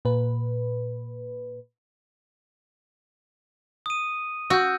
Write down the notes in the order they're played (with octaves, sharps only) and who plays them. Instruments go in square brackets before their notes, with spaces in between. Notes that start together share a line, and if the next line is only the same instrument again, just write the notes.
[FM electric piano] A#2 B4
[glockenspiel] D#6 D#7
[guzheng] F#4 [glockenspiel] E6 G6